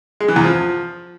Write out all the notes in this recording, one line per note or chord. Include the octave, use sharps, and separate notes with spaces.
G#3
E3
E2
F3